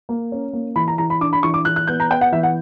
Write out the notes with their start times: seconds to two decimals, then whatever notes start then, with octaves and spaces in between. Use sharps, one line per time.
0.09 A#3
0.32 C#4
0.53 A#3
0.76 E3 B5
0.88 A#5
0.98 E3 A#5
1.10 B5
1.20 D4 D6
1.33 B5
1.43 E3 C#6
1.54 D6
1.65 E3 F#6
1.76 F#6
1.87 B3 G6
2.00 A#5
2.10 B3 G5
2.21 F#5
2.32 E3 E5
2.43 F#5